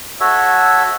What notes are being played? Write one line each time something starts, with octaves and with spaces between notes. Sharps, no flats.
F#4 A4 C#5 E5